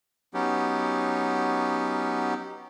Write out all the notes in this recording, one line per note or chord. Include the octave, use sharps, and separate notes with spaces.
F#3 B3 C#4 D#4 G4